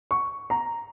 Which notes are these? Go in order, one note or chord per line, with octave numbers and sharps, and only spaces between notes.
C#6
A#5